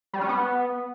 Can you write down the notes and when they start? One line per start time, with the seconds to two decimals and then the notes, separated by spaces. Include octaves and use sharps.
0.13 G3
0.21 C#4
0.29 B3